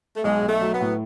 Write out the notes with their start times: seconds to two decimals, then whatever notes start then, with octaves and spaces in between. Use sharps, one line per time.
0.16 A3
0.24 B1 G#3
0.42 B1
0.49 A3
0.61 F#3
0.74 B3
0.81 A2